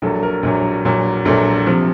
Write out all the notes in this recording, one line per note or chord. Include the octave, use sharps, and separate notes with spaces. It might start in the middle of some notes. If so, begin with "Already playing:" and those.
A#1 A#2 F#3 A4
A#4
A#1 A#2 F#3
A#1 A#2 F#3
A#1 A#2 F#3 A4
C3 F3